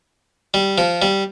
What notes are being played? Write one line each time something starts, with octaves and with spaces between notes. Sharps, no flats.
G3
F3
G3